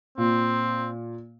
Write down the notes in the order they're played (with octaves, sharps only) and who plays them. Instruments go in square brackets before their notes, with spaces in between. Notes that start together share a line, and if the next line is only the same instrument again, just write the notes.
[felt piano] A#2 [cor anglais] C4